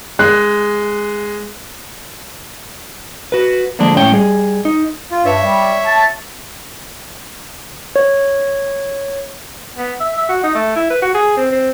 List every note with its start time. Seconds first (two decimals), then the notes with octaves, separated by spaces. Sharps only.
0.19 G#3 F#6
3.32 F#4 B4
3.79 D3 F3 G#3 A#3 D4
3.97 A2 C#4 C#5 G5
4.12 G3 G#4
4.65 D#4
5.11 F4
5.25 G2 C#5 E5
5.42 G3
5.85 A5
7.96 C#5
9.78 B3
10.00 E5
10.18 E5
10.29 F#4
10.44 D#4
10.55 A3
10.76 E4
10.90 B4
11.02 F#4
11.15 G#4
11.37 C4
11.51 C4